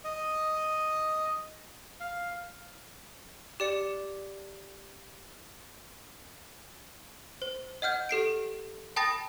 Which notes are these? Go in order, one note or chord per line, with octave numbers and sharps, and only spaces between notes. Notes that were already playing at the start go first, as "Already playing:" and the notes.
D#5
F5
G4 D5 C#7
C5
D#5 F#5 F6 G6
G4 A4 C7 D7
G5 A5 B5 D#6 A6 A#6